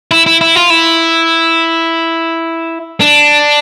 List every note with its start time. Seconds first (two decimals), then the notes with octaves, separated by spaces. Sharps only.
0.11 E4
0.26 E4
0.41 E4
0.56 F4
0.70 E4
3.01 D4